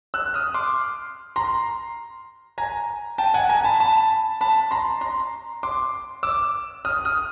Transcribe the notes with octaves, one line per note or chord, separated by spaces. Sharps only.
E6 F#6
D#6 F6
C6 D6
A#5 C6
G#5 A#5
G5 A5
F#5 G#5
G#5 A#5
A5 B5
A5 B5
A5 B5
A#5 C6
A#5 C6
C6 D6
D6 E6
D#6 F6
D#6 F6